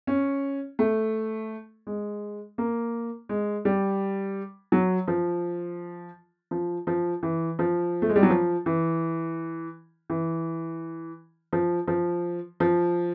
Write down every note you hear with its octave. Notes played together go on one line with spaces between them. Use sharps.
C#4
A3
G#3
A#3
G#3
G3
F#3
F3
F3
F3
E3
F3
A3
G#3
G3
F#3
F3
E3
E3
F3
F3
F3